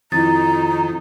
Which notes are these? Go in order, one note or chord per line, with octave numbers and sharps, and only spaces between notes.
F2 D#3 E4 A#5 A6